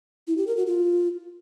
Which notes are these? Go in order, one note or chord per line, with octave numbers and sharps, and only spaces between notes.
E4
G4
A#4
F#4
F4